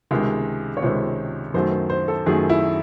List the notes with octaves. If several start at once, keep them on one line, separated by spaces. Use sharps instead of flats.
C#2 C3 D#3 G#3
C#5
C#2 C3 D#3 G#3 C5
F#2 D#3 F#3 A3 C5
C5
C5
A4
F#2 D#3 F#3 A3 G#4
E4